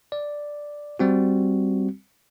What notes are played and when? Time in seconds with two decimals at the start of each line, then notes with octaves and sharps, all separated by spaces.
0.12 D5
0.99 G3 C4 F#4